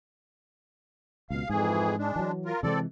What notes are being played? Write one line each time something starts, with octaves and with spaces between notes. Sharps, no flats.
C#2 B2 F5
F2 G#2 E3 G#4
G#3 D4
E3 F#3
F4 A#4
C3 E3 G#3 C4 A4 D5